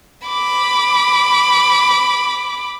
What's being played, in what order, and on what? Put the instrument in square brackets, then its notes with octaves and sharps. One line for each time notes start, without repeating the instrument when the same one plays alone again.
[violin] B5 D6